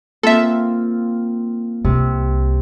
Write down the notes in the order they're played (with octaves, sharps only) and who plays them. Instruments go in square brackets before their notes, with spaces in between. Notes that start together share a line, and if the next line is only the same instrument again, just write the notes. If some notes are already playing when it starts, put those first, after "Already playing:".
[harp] A#3 C4 F4 [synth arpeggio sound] A4 E5
[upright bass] C2 [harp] C3